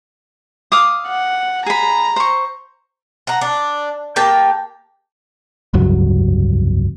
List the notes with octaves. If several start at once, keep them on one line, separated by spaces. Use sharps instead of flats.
F5 D6 D#6
F#5
G#4 A#5 B5
C5 C#6
F#5 A#5
D4
A#3 G4 G5 A5
F1 C#2 G2 F#3